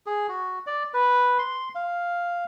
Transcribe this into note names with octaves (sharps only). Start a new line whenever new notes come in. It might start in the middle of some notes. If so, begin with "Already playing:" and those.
G#4
F#4
D5
B4
C6
F5